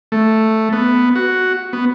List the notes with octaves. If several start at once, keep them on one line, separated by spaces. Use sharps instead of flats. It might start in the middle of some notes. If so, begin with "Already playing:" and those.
A3
B3
F#4
B3